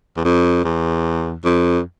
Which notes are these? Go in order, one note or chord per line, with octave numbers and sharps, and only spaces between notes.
E2
F2
E2
F2